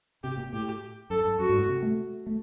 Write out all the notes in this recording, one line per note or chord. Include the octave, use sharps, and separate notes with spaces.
C3 G4
A#2
A2 G4
F#2 A4
F#2
F#2 F#4
G2
A2
C3
A3
A3